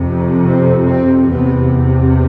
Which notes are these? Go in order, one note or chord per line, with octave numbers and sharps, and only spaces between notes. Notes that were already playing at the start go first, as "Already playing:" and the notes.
Already playing: F2 C3
C4
C4
E2 C3 B3